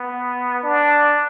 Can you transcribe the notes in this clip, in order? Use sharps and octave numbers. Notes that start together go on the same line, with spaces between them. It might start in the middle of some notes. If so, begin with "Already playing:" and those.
Already playing: B3
D4